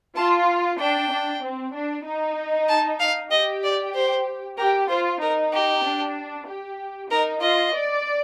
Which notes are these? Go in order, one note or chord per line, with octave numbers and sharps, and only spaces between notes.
F4 A5
D4 G5
D4
C4
D4
D#4
A5
F5
G4 D#5
D5
C5
G4 A#4
F4 C5
D#4 A#4
G4
D4
G4
D#4 A#4
F4 D#5
D5